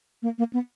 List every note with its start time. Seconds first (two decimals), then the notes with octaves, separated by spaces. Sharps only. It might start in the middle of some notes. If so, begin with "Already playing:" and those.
0.22 A#3
0.38 A#3
0.53 B3